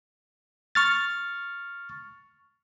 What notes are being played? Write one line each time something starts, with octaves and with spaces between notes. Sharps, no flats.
C#6 F6 A6